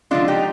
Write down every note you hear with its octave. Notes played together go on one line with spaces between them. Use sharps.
D3 F3 G#3 D4 F4
D#4 G4